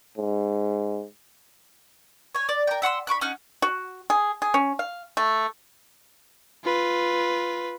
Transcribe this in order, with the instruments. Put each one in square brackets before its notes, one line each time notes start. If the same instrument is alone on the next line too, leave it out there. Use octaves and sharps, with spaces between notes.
[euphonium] G#2
[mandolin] C#5 G#5
D5
A#4 G5
E5 F#5 C6 E6
B5 C#6 D6 F#6
C#4 D#4 F#5 F6
[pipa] F#4
G#4
G#4
C#4
F5
A3
[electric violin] F4 B4